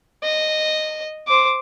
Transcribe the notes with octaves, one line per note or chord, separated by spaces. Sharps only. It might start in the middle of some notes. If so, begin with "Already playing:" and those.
D#5
C5 D6